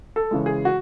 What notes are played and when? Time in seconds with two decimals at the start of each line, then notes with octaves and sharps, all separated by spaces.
0.16 A4
0.31 C#3 E3 G#3
0.46 G#4
0.65 F#4